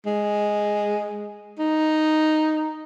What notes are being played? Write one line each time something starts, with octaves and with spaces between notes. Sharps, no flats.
G#3
D#4